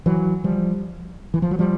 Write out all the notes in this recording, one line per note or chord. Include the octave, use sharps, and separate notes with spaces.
E3 F#3
F3 G3
E3
F3
F#3
F3 G3